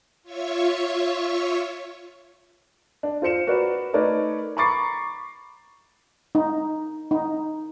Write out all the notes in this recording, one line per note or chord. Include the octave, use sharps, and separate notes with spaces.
F4 C#5 E5 C#6
D4
F4 C5 C#7 E7
F#4 A#4 B4 D5
A3 D#4 A#4 B4 C#5 D5
A#5 B5 C#6 D6 A6 C7
D#4
D#4